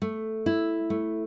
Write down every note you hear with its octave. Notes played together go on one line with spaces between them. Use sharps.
A3
E4
A3